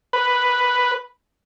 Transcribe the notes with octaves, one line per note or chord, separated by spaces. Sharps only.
B4